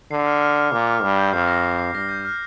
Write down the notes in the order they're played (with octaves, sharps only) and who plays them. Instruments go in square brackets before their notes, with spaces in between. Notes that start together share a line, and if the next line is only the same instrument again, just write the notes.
[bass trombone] D3 [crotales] C7
[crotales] F6
F6
F6
[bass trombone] A#2 [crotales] D6
[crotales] F6
[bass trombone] G2 [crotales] F6
[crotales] G6
[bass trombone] F2 [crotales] C7
[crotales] A#6
C7
C7
[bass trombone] G2 [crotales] A#6
[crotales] G6
F6